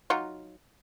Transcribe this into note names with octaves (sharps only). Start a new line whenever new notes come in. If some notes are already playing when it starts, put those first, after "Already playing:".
F#3 D#4 F4